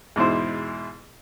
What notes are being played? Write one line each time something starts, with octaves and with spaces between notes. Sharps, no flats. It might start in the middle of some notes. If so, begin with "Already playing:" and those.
E2 G#2 B2 E4 C5